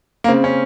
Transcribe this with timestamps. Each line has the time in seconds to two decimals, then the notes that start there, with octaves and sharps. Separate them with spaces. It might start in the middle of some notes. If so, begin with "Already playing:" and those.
0.24 A#3
0.28 C#3 C4
0.44 C#4